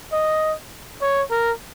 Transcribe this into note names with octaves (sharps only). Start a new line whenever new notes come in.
D#5
C#5
A#4